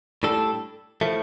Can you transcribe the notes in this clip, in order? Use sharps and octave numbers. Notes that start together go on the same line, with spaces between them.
A2 G3 D4 A4
A2 F3 A3